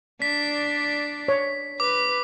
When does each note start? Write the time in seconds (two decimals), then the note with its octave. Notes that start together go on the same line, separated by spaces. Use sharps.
0.22 D4 D5 B6
1.28 C#5
1.80 B4 D6